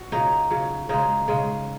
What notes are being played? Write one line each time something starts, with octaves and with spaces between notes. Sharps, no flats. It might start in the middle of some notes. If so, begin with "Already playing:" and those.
Already playing: F#4
C#3 F#3 D#4
C#3 F#3
C#3 G#3 D#4
C#3 G#3